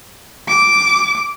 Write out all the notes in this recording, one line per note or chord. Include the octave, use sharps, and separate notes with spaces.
D6